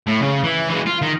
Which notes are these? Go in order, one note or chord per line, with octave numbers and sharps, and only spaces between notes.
A2
C#3
E3
E3 G#3
F4
D#3